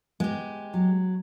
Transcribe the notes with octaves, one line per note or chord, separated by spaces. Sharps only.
G#3 B3 G4
F#3